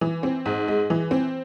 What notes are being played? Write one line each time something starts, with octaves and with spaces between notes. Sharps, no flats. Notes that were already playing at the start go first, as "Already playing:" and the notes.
E3
C4
G#2
G#3
E3
C4